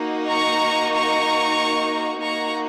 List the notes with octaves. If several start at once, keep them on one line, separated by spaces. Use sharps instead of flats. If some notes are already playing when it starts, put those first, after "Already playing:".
Already playing: A#3 D#4 F#4
A#5 C#6
A#5 C#6
A#3 D#4 F#4 A#5 C#6